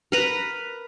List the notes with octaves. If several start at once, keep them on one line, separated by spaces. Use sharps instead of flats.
A#4 B4 A#5